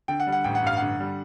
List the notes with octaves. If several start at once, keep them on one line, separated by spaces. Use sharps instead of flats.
D3 G5
F#5
G3
F#5
A1 G5
F#5
G2 F5
F#5
D3
G3